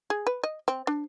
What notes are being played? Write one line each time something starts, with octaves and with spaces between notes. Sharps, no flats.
G#4
B4
D#5
C4
D4